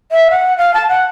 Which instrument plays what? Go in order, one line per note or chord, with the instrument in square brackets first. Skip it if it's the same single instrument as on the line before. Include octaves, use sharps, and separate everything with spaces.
[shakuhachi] E5
F#5
F5
A5
F#5